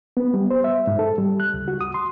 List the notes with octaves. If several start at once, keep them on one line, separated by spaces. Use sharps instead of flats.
B3
G3
C5
E5
G#2
A4
G3
F#6
C#2
F#4
D#6
C6